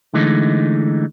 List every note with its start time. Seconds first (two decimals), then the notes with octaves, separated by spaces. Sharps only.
0.14 D3 E3 G#3 A3 D#4